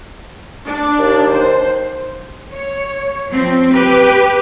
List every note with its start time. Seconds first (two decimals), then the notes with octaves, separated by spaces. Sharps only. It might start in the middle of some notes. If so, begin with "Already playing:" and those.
0.66 D4
0.98 D#2
1.31 C5
2.53 C#5
3.30 F3 C4
3.73 G4 B4